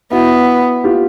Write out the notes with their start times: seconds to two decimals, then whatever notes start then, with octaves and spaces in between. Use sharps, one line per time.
0.12 B3 E4 F#4
0.84 F4 G4